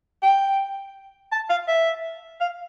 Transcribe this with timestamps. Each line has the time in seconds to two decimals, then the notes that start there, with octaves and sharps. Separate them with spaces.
0.23 G5
1.32 A5
1.50 F5
1.68 E5
2.41 F5